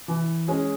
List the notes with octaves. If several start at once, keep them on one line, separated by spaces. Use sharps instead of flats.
E3
G#3 C#4 G#4